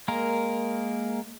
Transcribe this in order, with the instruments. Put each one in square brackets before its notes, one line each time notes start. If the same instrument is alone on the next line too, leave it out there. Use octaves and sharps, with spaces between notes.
[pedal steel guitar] G#3 A#3 A#4